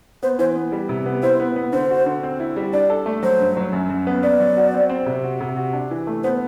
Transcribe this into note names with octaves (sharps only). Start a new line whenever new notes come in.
B3 C5
E3 C5
B3
G3
C3
B3
E4 C5
B3
B3
D3 C5
F#4
D3
C4
E4
G3
D4 D5
A4
A3
F#3 C5
G2
F#3
F#2
F#2
B3
B3 D5
F#3
F#4
C4
C4
C3
F#4
C3
F#4
D4
E3
A3
B3 C5